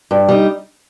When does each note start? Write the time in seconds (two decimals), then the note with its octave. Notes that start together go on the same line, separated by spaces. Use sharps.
0.11 G2
0.29 G3 D#4